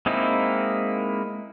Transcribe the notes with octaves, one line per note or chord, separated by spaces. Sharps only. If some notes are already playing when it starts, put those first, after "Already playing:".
G#3 A#3 C4 D#4 E4